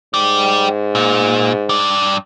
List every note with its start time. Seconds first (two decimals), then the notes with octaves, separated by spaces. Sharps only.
0.14 G#2 G4 D5
0.95 A#2
1.69 G2 D5